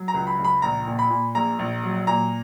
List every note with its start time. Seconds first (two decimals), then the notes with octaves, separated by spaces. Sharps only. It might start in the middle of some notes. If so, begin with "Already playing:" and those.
Already playing: F#3
0.08 A#5
0.14 C#2
0.27 B5
0.39 C#2
0.45 B5
0.62 A#1 A#5
0.87 A#2
0.99 B5
1.10 A#2
1.35 A#1 A#5
1.59 A#1
1.83 F#3
2.07 A#2 A#5